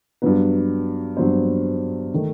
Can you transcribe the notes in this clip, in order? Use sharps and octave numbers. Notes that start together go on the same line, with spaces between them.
G2 F#3 B3 B4
G2 F#3 B3 C5
D#3 A3